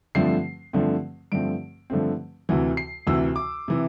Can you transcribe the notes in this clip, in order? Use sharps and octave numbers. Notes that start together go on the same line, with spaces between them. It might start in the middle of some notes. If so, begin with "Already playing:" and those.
G2 D3 F3 A3 C4 C7
G2 D3 F3 A3 C4
G2 D3 F3 A3 C4 D7
G2 D3 F3 A3 C4
D2 C3 E3
C7
D2 C3 E3 E6
D6
C3 E3